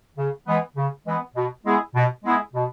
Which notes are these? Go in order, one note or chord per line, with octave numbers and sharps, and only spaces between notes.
C#3
E3 G#3 B3
C#3
E3 G#3 B3
B2
G#3 B3 E4 G#4
B2
G#3 B3 E4 G#4
B2